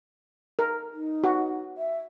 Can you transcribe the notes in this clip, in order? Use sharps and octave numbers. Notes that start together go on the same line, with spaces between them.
A#4
D#4
F#4
E5